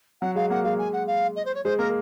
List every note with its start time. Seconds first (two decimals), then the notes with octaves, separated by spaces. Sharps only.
0.21 F#3 F#5
0.35 G#3 F5
0.50 A#3 F#5
0.64 G#3 F5
0.78 G#5
0.93 F#5
1.07 F5
1.36 D#5
1.45 C5
1.55 C#5
1.64 G#3 C5
1.78 A#3 A#4